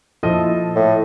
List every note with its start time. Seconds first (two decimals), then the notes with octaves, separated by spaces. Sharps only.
0.23 A#2 F3 E4 A4 D#5
0.75 A2